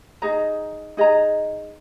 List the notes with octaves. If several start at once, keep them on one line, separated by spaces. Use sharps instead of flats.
D#4 G#4 D#5 A#5
D#4 G#4 D#5 A#5